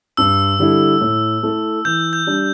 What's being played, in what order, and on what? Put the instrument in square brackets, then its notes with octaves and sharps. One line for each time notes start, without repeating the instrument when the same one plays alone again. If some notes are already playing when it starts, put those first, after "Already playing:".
[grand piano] G2 [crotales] E6
[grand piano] D3 G3 E4 A4
A2
A3 E4 A4
[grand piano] E3 [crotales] G6
[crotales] G6
[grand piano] G3 D4